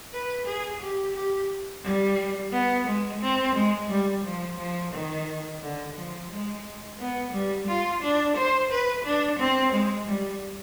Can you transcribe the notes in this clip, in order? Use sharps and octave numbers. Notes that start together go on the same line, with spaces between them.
B4
G#4
G4
G4
G3
B3
G#3
C4
G#3
G3
F3
F3
D#3
D3
F3
G#3
B3
G3
F4
D4
C5
B4
D4
C4
G#3
G3